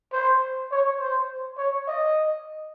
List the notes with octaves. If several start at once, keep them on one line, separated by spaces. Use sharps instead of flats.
C5
C#5
C5
C#5
D#5